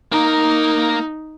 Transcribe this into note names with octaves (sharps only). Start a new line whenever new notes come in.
A#3 D#4 A#4